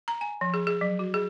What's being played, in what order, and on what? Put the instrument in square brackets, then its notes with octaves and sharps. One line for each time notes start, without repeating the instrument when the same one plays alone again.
[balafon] A#5
G#5
F3
G#4
G#4
F#3
F#4
G#4